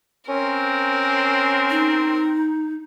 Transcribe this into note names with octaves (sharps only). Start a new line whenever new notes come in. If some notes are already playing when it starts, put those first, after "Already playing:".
C4 C#4 A#4
D#4